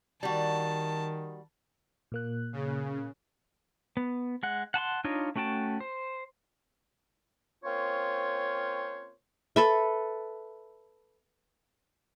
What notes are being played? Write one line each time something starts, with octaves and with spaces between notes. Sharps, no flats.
D#3 G3 F#4 A5
A#2 A#3 F#6
C#3
B3
G#3 F#5
F#5 A5 B5 C6
D4 D#4 F4 C#5 D#5
A3 C#4 F#4 G5 A5
C5
A#3 C4 C#4 F4 C5 C#5
A4 B4 E5